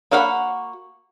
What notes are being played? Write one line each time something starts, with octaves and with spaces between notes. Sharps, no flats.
A#3 F#4 F5 F#5 B5